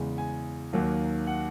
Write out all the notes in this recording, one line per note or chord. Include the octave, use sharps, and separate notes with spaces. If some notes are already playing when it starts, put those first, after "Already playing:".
Already playing: E2 C#3 G#3
G#5
D#2 D#3 F#3 A#3
F#5